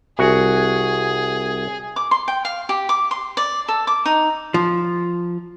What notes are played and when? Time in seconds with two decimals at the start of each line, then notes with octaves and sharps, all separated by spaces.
0.19 C2 F#4 G#4 F#5
1.96 D6
2.11 C6
2.28 G5
2.45 F5
2.69 G4
2.89 D6
3.11 C6
3.37 D5
3.68 A4
3.87 D6
4.05 D#4
4.54 F3